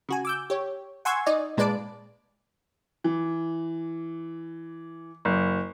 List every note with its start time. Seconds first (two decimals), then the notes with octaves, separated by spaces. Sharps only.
0.09 C#3 F#4 G#5
0.25 D6 E6 G6
0.50 G4 C#5
1.05 F#5 G#5 C6 C#6 E6 G#6
1.26 D#4 D5 D#5
1.57 A#2 G#3 B4 D5 A5 D7
3.04 E3
5.25 F#1